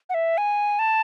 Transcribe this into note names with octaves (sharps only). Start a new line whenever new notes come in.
F#5
E5
G#5
A5